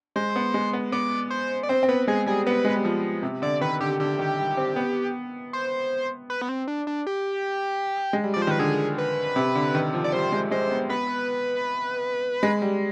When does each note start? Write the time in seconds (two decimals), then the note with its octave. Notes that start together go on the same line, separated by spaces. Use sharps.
0.16 G#3 C5
0.36 B3
0.54 G#3
0.73 B3
0.92 B3 D5
1.30 C5
1.63 D5
1.69 C4 C5
1.83 C4
1.89 B3 B4
2.07 G#3 G#4
2.26 G3 G#4
2.46 B3 B4
2.65 G#3
2.75 G3
2.85 F3
3.23 C3
3.42 D3 D5
3.61 D#3 B4
3.80 D3 G4
4.00 D3 G4
4.19 D#3
4.38 G3
4.57 C4
4.76 B3
5.53 C5
6.30 B4
6.42 B3
6.49 C4
6.68 D4
6.87 D4
7.07 G4
8.13 G#3
8.24 G3
8.34 F3 D5
8.42 C5
8.47 D#3 B4
8.59 D3 G#4
8.98 B4
9.36 C3
9.55 D3
9.75 D#3
9.94 F3
10.04 D5
10.13 G3 C5
10.32 G#3
10.51 G#3 C5
10.71 B3
10.89 B3 B4
12.43 G#3
12.62 G3